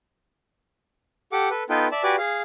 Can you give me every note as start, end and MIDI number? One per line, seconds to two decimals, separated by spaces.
1.32 1.49 67
1.32 1.49 69
1.32 1.49 78
1.32 1.49 86
1.50 1.64 69
1.50 1.64 71
1.70 1.88 59
1.70 1.88 63
1.70 1.88 65
1.70 1.88 69
1.70 1.88 71
1.70 1.88 79
1.92 2.03 74
1.92 2.03 76
1.92 2.03 81
2.03 2.16 66
2.03 2.16 67
2.03 2.16 71
2.03 2.16 74
2.03 2.16 80
2.03 2.16 86
2.18 2.43 68
2.18 2.43 77